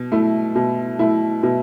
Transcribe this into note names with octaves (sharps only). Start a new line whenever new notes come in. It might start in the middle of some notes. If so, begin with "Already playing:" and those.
Already playing: B2
A3 E4
B2
A3 E4
B2